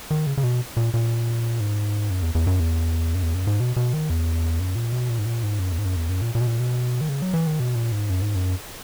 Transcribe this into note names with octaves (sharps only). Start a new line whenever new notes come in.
D#3
C#3
C#3
B2
A#2
A#2
G#2
F#2
E2
E2
F#2
E2
F#2
E2
F#2
G#2
B2
B2
D#3
E2
F#2
A#2
B2
A#2
G#2
A#2
G#2
F#2
E2
G#2
F#2
E2
F#2
A#2
A#2
B2
A#2
B2
D#3
C#3
F#3
E3
D#3
B2
A#2
G#2
F#2
G#2
F#2